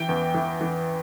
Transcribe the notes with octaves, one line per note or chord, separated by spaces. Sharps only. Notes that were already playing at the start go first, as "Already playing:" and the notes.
Already playing: E3 G5
E2
E3
E3